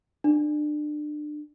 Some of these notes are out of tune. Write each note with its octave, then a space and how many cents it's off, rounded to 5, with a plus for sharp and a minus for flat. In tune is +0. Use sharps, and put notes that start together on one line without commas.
D4 +30